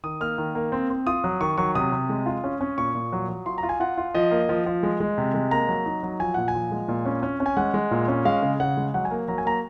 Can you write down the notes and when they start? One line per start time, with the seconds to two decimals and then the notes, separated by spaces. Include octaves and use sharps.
0.03 D#3 D#6
0.21 A#3 F6
0.38 D#3
0.55 A#3
0.72 C4
0.90 C4
1.06 F4 D#6
1.24 F#3
1.41 D#3 C#6
1.58 F#3 C#6
1.75 C3 D#6
1.92 C3
2.09 G#3
2.26 F4
2.44 C#4
2.61 C#4
2.78 A#2 C#6
2.95 A#2
3.13 F#3
3.29 F#3
3.46 F4 C6
3.58 A#5
3.63 F4
3.69 G#5
3.80 F4 F#5
3.98 F4
4.15 F3 D#5
4.31 A#3
4.49 F3
4.66 F3
4.83 G#3
5.00 G#3
5.18 C3
5.34 G#3
5.51 A#3 A#5
5.68 F#3
5.86 D#4
6.03 F#3
6.20 F3 G#5
6.34 A#2 F#5
6.48 G#5
6.54 F3
6.71 G#3
6.88 A#2
7.06 C#4
7.23 C#4
7.40 C#4
7.46 G#5
7.57 G#3 F#5
7.74 G#3
7.91 A#2
8.08 C#4
8.25 G#3 F5
8.42 C#3
8.60 C#3 F#5
8.77 G#3
8.94 F#3 F#5
9.05 G#5
9.11 A#3
9.28 F#3 A#5
9.38 G#5
9.45 A#3 A#5